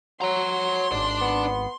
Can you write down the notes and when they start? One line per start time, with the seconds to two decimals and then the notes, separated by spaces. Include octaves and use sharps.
0.22 F#3 C#5 A#5 C6
0.92 G#1 D4 D5
1.21 B3